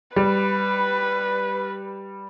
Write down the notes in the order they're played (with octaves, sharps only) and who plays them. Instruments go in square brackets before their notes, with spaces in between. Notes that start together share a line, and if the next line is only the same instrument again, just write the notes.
[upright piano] G3 [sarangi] B4